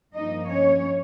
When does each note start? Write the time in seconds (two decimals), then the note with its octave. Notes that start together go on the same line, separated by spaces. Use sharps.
0.13 G2 F3 A#3 D#4 D#5
0.48 C#4 C#5